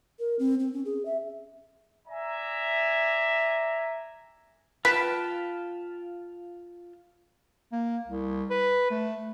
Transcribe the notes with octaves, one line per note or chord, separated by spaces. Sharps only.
A#4
C4
C4
C#4
G#4
E5
D5 E5 G#5 A#5
F4 B4 G5 A5 B6
A#3
C2
B4
A3